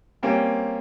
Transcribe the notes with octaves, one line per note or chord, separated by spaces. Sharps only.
G3 A#3 C4 C#4